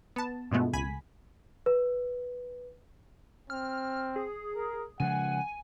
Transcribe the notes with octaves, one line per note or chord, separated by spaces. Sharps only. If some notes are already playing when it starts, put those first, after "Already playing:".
B3 A5
G2 B2 F3 G#3 A3 B3
C#2 G#5 B5 B6
B4
C4 F6
G#4
A#4
C#3 F3 G#3 F#5 G#5